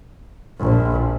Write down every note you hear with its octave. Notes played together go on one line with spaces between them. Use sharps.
A#1